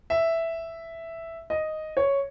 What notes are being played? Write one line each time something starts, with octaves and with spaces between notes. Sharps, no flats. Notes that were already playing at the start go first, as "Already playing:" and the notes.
E5
D#5
C#5